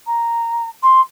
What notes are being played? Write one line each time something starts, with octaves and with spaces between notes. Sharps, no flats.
A#5
C6